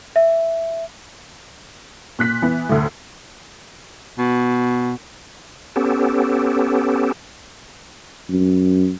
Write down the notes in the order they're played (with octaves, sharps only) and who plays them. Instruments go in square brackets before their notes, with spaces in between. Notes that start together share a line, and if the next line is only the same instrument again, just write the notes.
[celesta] E5
[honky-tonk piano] A#2 F#6 B6
E3 B3
D2 A2
[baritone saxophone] B2
[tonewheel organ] B3 C#4 G4 A4
[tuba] F#2